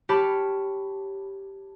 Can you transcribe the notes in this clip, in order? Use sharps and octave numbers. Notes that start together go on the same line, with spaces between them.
G4 C#5 A5 B5 C#6 F6